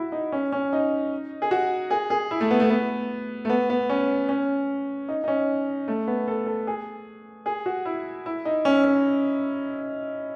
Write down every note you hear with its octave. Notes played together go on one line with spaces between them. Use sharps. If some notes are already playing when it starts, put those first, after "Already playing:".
Already playing: E4 F#4
D#4
C#4
C#4
D#4
G#4
F#4
G#4
G#4
E4
A3
B3
A3
B3
A3
B3
B3
C#4
C#4
D#4
D#4
C#4
A3
B3
A4
A4
G#4
G#4
F#4
E4
E4
D#4
C#4
C#4